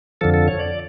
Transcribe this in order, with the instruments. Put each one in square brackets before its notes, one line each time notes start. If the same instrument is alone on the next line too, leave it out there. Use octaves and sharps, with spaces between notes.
[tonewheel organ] F2 D3 F3 A4
A4
C#5
D5